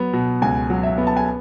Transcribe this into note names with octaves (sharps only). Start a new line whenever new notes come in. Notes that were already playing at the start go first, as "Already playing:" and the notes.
Already playing: F#3 B3
B2
C#2 G#5
F#3
E5
B3
A5
G#5